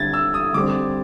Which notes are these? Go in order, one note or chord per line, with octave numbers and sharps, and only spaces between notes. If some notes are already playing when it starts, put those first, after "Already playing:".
Already playing: D3 G3 C4 G#6 A6
E6
D#6
D3 G3 C4 D6